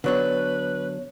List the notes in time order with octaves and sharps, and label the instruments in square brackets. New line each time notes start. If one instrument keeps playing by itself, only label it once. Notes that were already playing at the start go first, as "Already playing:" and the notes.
[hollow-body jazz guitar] D3 F#3 D4 [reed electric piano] B3 C#5 [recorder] B4